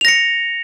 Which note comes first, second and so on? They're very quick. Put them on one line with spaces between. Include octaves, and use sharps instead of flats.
F7 A#6 C#7